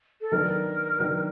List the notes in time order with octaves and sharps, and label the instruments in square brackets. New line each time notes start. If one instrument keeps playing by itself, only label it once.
[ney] A4
[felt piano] D#3 F#3 B3 D4 [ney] A#4
[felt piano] D#3 F#3 B3 D4